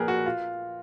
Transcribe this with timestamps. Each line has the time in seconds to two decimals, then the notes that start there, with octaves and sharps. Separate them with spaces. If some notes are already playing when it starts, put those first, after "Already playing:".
Already playing: A#1 A#2 G#4 A#4 B4
0.08 F#4
0.26 F4